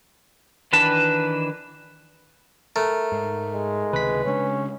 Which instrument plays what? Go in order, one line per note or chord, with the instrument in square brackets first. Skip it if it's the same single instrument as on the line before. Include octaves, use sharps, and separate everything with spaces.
[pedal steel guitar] D#3 E3 D4 B4 A5
[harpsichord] A3 [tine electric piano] A#4
[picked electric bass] G#2
[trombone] G#3
[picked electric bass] C#2 C3 D#3 [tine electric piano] B4 B6
[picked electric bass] C#3 G#3 D4 [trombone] C#4